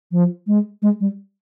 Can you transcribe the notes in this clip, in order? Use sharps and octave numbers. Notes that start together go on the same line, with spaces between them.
F3
G#3
G#3
G3